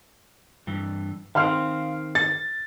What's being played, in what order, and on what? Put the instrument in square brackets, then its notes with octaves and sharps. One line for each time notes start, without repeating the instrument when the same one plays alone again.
[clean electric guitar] G2 E3
[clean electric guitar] D#3 C4 [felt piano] F5 C6 F6
[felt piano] A6